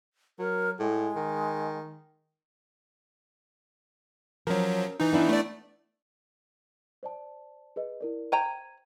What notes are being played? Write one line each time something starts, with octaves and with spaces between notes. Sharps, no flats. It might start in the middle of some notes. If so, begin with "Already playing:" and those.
F#3 A#4
A2 G#3
D#3
F3 F#3 C#4 A#4
E3 D#4
B3 D4 E4
A3 D5
C5 D5 A5
G#4 B4 D#5
E4 A#4 D5
C5 G5 A#5 G#6 D#7